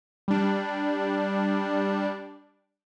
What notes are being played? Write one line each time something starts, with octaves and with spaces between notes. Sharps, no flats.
G3 D4